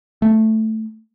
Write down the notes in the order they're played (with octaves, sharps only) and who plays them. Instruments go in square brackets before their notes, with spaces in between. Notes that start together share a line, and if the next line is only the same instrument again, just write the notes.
[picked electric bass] A3